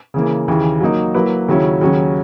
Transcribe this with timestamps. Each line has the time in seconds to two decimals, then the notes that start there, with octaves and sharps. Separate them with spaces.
0.14 C#3 E3 A#3
0.48 D#2 C#3 E3
0.81 F#3 A#3 D#4
1.14 F#3 A#3 E4 B4
1.48 D#2 C#3 F#3 C#4 E4
1.81 D#2 C#3 F#3 C#4